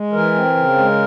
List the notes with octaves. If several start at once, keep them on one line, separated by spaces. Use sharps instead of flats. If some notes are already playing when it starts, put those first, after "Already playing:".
Already playing: G#3
E3 A#4
C4
C#3
G#3